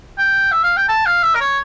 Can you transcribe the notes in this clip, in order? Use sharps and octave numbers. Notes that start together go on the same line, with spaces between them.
G5
E5
F5
G5
A5
F5
E5
A#4
C#5